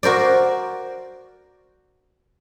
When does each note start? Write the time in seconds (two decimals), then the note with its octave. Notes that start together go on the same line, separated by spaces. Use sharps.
0.03 F#4 A#4 C5 D5